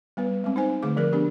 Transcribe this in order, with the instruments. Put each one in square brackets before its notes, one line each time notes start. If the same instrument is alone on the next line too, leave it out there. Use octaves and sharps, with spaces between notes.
[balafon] G3 B3 B4
G#3 C4
D#4 C5 G#5
D3 A3 G#4 D6
F3 G#4 A#4
B3 D4 G4